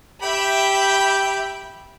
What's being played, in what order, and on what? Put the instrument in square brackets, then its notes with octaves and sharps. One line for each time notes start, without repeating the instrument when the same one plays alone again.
[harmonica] G4 G5 [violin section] E5 B5